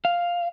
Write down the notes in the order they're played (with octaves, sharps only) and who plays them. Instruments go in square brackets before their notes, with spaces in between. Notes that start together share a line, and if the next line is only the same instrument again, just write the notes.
[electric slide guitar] F5